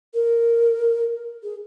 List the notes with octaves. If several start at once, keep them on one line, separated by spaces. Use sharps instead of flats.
A#4
G#4